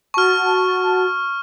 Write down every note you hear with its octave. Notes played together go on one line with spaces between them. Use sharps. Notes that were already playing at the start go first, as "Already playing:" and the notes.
F#4 A5 C#6 F6